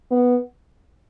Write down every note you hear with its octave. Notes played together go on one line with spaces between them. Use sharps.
B3